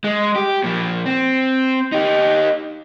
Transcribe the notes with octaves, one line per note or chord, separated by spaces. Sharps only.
G#3
G4
A#2 F3
C4
D#4 G4